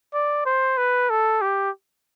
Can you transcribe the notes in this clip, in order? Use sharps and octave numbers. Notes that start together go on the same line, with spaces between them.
D5
C5
B4
A4
G4